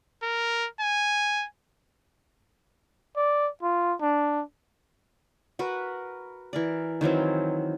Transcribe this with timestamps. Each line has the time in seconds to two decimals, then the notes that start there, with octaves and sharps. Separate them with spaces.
0.23 A#4
0.81 G#5
3.16 D5
3.63 F4
4.01 D4
5.59 F#4 A#4 B4
6.53 E3 A#4 D5
7.01 D#3 E3 F#3 C4